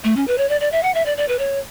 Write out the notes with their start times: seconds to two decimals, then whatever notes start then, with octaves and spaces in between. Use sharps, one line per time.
0.04 A3
0.16 C#4
0.28 B4
0.38 C#5
0.49 D5
0.61 D5
0.72 E5
0.83 F#5
0.94 E5
1.06 D5
1.17 D5
1.28 B4
1.39 C#5